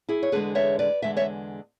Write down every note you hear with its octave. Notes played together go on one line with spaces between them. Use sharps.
E4 G#4
C#5
E2 D3 G#3 G#4 B4
C#5 E5
B4 D5
E2 D3 G#3 E5
C#5 E5